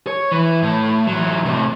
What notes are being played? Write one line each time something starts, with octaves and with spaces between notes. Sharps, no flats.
C#5
E3
A2
E3 F#3
A2 C3